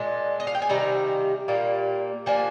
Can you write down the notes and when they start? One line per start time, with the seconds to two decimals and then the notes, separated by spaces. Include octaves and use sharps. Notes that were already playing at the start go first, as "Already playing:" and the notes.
Already playing: A#2 G#3 D4 D#5
0.40 D#5
0.47 F5
0.55 G5
0.62 G#5
0.69 C3 D#3 G3 A#3 A#5
1.48 A#2 G3 A#3
2.26 F3 A#3 D4 G#5